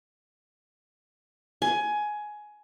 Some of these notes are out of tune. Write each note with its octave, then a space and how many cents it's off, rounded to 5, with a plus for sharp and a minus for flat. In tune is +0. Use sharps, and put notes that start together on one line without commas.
G#5 +15